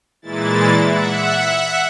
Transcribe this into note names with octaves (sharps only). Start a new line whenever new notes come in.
A#2 E3 G#3 E4 A6
E5 F#5